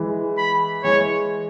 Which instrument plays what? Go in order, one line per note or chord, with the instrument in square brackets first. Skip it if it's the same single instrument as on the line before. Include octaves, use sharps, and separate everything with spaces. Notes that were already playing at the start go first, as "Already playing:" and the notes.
Already playing: [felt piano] E3 G#3
[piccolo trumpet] B5
[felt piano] E3 G#3 [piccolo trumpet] C#5